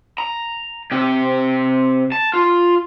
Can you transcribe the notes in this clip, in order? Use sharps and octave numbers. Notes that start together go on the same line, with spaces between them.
A#5
C3 G4
A5
F4